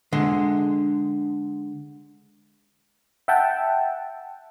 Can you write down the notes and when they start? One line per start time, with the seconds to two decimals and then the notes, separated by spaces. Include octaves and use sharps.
0.13 D3 G#3
3.28 E5 F#5 G5 A5